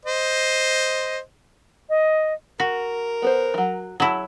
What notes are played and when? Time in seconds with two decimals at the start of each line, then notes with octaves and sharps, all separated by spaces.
0.05 C5 D#5
1.89 D#5
2.60 F#4 A#4
3.22 B3 B4 C5
3.54 E3 F#3
4.00 F#3 E4 G#4 A5